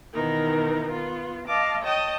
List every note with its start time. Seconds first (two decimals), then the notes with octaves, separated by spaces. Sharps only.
0.14 B2 D#3 E3 D#4 A#4
0.93 B3 F4
1.47 D#5 F5 A5 D6
1.82 C#5 D#5 G5 A5 D#6